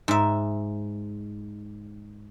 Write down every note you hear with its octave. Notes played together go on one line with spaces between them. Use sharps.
G#2 E5